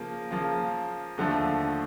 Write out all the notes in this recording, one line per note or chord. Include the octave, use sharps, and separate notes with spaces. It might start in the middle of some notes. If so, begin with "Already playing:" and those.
Already playing: C#3 F3 A#3
C#3 F3 A#3
D#2 D3 F3 A3